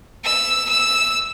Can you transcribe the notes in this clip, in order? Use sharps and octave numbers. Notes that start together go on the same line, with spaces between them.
E6
E6